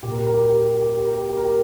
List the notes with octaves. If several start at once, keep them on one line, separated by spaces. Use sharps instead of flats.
A#2 G4
A#4
G4
A#4
G4
A#4
G4
A#4
G4
A#4
G4
A#4
G4
A#4
G4
A#4
G4
A#4
G4